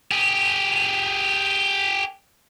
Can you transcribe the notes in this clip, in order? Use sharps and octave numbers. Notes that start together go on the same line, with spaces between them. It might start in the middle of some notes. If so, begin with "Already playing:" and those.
G4 G#4